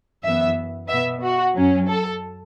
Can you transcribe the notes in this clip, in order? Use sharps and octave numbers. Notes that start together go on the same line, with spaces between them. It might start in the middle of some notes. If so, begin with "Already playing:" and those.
F#2 E3 B3 E5
B2 B3 E5
F#4
F#2 F#3 C#4
A4